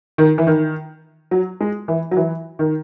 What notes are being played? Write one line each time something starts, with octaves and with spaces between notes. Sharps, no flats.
D#3
E3
D#3
F#3
G#3
E3
F#3
E3
D#3